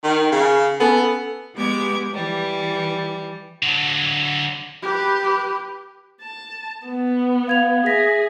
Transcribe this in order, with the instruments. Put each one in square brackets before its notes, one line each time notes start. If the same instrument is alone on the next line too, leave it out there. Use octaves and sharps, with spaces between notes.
[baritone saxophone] D#3
C#3
[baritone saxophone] B3 [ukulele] C#4 A4
[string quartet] G#3 B3 G4 D6 G#6
E3 G3
[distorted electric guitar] D3 F#3
[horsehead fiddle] G4 B4
[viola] A5
B3
[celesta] F5 G#6 F7
[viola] G#4 [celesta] E5 A#6 B6